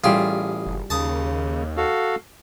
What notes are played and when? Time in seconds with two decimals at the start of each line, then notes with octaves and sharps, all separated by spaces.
0.04 A1 G3 F4 G#4
0.66 F#1
0.90 D#2 C#3 A5 D#6
1.77 F#4 A4 F5